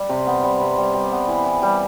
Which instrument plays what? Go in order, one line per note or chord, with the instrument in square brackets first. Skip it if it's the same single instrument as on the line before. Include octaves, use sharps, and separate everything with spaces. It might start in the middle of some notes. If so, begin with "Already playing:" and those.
Already playing: [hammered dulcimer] G3
C3
B3
G3
C3
G3
G3
B3
E3
E3
G3